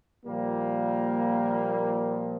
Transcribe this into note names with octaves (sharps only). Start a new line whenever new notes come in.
A#2 F3 G3 A#3